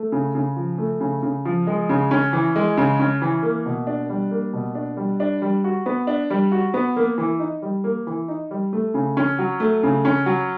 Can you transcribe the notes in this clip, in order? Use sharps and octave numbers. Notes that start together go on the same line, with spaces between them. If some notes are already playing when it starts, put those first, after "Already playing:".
Already playing: A3
C#3
C#3
F3
A3
C#3
C#3
F3
G#3
C#3
C#4
E3
G#3
C#3
C#4
E3
A#3
B2
D4
G3
A#3
B2
D4
G3
D4
G3
F#4
B3
D4
G3
F#4
B3
A#3
E3
D#4
G3
A#3
E3
D#4
G3
A3
C#3
C#4
F#3
A3
C#3
C#4
F#3